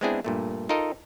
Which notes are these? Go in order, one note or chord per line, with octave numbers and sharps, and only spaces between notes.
G#3 B3 C4 D4 E4 G#4
G2 A#2 A3
D#4 F4 A4 A#4 D#5